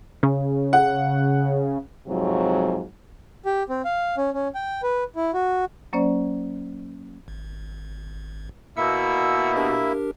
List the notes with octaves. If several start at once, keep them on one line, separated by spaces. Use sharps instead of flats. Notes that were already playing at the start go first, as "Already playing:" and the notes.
C#3
F#5
F2 G#2 C3 F#3
G4
C4
F5
C#4
C#4
G5
B4
E4
F#4
F#3 A#3 C#4 C5 D5
G#1
B2 A#3 E4 E5 E6 C#7
D4 G4 A#4